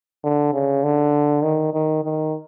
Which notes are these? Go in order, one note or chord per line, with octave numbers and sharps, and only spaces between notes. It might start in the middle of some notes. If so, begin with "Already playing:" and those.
D3
C#3
D3
D#3
D#3
D#3